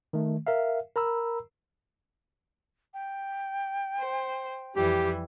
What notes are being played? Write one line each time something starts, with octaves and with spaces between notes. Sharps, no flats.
D#3 A3
A#4 E5 F5
A#4 A#5 B5 E6
G5
C5
F2 E3 G3 G4